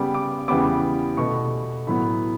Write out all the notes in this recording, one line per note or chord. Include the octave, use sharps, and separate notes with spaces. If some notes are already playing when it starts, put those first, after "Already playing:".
Already playing: C#3 G3 B3 D6
D6
E2 C#3 G3 B3 D6
B2 A3 C#6
A2 F#3 B3 B5